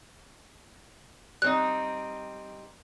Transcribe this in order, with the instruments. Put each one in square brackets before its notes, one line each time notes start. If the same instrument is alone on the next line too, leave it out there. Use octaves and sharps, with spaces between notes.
[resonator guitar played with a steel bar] G3 C4 D#4 [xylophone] F#6